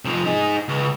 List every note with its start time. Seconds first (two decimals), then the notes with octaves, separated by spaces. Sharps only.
0.05 C3 F3
0.25 D#4 G#4
0.68 C#2